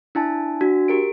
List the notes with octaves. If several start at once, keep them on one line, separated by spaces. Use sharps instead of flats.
D4 E4 G#5 A5
D4 F#4
G4 A#4 D7